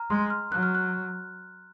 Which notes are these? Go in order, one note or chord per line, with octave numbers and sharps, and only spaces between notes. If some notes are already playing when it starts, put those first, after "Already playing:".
Already playing: A#5 F6
G#3 C6
F6
F#3 F#6
F6
F#6